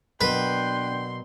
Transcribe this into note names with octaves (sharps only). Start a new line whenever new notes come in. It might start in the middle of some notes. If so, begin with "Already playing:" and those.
B2 F#3 A#3 D4 B4 G5 C6